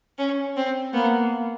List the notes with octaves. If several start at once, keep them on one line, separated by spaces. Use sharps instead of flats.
C#4
C4
A#3 B3